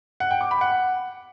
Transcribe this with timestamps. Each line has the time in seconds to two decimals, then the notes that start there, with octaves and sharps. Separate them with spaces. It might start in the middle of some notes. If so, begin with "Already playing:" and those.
0.20 F#5
0.31 G5
0.41 D6
0.51 B5
0.61 F#5